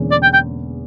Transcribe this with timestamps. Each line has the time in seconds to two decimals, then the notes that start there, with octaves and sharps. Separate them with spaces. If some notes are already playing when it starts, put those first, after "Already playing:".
Already playing: E1 E2 D3 A#3 C#4
0.11 D5
0.23 G5
0.33 G5